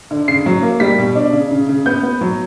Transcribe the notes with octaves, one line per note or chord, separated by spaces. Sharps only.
D3
C#3 C7
F#3
A#3
G3 B6
B2
D4
C#3
C#3
C#3
B3 G6
B3
F#3